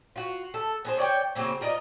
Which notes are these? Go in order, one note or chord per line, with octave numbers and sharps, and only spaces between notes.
F4 F#4
A4
B3 G#4 C5
C#5 D5 F#5 G5
C#3 F#3 A#3 C4
F4 A#4 D5 D#5